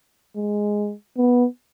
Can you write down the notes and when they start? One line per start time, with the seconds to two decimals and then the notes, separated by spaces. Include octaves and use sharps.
0.36 G#3
1.17 B3